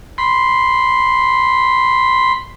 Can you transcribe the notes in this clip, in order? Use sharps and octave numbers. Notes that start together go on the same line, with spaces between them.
B5 C6